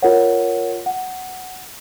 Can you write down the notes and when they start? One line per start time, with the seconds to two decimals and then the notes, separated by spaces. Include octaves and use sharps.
0.02 F4 A#4 C#5 F#5
0.86 F#5